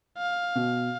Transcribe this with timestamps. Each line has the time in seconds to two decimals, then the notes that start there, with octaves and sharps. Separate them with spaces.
0.18 F5
0.55 B2